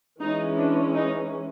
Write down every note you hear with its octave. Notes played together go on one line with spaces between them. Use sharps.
E3 G#3 C#4 D#4
D4
D#4